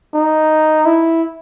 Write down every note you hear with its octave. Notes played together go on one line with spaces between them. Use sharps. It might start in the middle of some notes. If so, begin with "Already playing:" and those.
D#4
E4